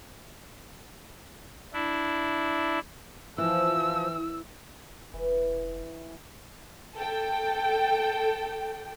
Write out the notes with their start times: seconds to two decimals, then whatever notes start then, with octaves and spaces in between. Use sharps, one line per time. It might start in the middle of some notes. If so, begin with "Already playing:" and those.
1.73 D4 E4
3.38 E3 F3 E6
5.13 F1 E3
6.95 A4 G5